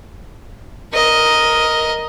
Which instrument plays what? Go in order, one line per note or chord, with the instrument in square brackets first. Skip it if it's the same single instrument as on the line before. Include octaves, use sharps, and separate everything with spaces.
[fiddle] A#4 D#5